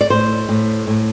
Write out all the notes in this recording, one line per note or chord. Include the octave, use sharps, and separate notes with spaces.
D5
A2 C5
A2
A2